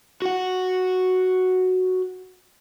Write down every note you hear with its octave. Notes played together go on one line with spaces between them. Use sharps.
F#4 F#5